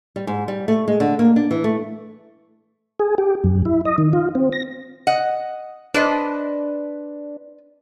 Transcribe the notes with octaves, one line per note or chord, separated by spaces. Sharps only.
G3
G#2
G3
A3
G#3
D3
A#3
D4
E3
A3
G#4
G4
F#2
E4
D#5
D#3
F4
C4
A#6
D#5 F#5
D4 B4 C5 D#5